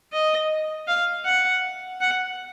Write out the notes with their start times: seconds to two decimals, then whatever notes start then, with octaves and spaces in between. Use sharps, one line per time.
0.13 D#5
0.87 F5
1.25 F#5
2.01 F#5